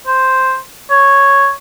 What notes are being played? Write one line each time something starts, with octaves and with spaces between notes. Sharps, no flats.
C5
C#5